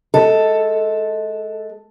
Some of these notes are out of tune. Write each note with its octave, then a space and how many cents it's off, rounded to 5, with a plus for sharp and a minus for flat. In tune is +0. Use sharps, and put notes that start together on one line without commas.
G#3 +30 A4 +5